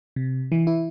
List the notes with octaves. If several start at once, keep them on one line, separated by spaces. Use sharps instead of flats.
C3
E3
E4